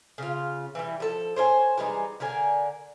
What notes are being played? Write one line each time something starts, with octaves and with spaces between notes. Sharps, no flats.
C#3 F4
E3 G3
F3 A4
C5 C#5 E5 G#5
E3 G3 G#3 D#4
D3 A#4 D5 G#5